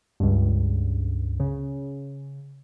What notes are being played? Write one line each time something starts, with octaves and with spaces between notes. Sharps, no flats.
C#2 G2
C#3